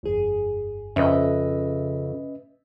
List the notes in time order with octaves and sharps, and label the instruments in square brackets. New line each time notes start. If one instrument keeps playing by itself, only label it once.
[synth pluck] G1 F2 G#4
[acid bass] F2 [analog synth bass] C#3 [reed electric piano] C#4 B4 D#5 [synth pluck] E5